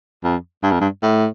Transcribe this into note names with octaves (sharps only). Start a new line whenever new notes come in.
F2
G2
F2
G2
A2